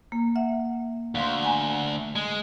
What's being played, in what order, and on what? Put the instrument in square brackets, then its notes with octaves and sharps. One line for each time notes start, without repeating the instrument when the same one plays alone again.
[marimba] A#3
E5 F#5
[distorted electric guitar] D2 [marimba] F5 C6
[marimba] F#5 G#5 A#5
[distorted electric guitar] G#3